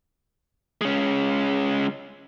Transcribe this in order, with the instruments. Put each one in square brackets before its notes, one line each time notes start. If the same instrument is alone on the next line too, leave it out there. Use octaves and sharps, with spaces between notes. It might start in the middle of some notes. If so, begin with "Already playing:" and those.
[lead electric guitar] G#3 C#4